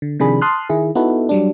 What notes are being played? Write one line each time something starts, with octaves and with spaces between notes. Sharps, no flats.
D3
C3 D#3 F3 D4 G#4 B5
A5 C6 D#6 F6 F#6
D#3 E4 G#4
B3 D#4 E4 F#4 A4 B4
F#3 G3 D4